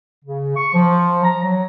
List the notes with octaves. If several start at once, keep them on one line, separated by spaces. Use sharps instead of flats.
C#3
C#6
F3
A#5
F#3